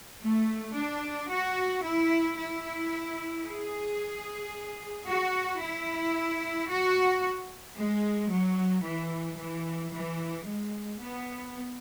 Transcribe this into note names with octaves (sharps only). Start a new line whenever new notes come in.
A3
D4
F#4
E4
E4
G#4
F#4
E4
F#4
G#3
F#3
E3
E3
E3
G#3
B3